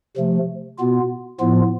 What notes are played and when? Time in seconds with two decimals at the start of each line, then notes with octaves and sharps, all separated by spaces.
0.17 C3 F3 A3
0.78 B2 B3 F4
1.39 A2 F3 B3 F4